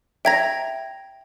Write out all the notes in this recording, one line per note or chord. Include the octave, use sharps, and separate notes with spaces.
E5 G5 A#5 G#6 A#6